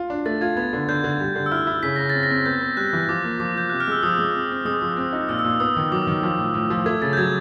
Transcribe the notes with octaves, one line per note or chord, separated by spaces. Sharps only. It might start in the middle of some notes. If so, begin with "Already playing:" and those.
Already playing: F4
D4
A3 A6
F4 G#6
B3 G#6
D3
D3 G6
D3
G3
D3
E6
E4 F6
E4
C#3 B6
C#3 A#6
C4 A6
A#6
C4
B3 G6
B3
G3 F#6
E3
F3 D6
A#3
F3 D6
F3 G6
C3 F#6
F6
G#3 E6
F3 D#6
G#3
C4
C4
G#3 D#6
F3
C4
D#4
A#2 E6
E6
A#2
D#6
B3 D#6
D#3
F#3 D6
D#3
F3
A2
A2
F3
A3 G#6
C#3 A6
G6
F#3 G#6